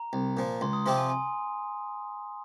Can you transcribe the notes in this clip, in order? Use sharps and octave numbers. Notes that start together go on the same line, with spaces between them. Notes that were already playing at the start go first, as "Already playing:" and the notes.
Already playing: A#5
C2
A#2 F3
C#2 C6
D#6
C3 F3 C4 G4 C6
G#5
G#5